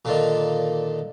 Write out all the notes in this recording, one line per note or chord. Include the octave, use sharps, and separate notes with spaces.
A#2 D3 D#3